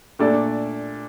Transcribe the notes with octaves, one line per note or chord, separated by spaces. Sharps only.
A#2 A3 D4 A4 D5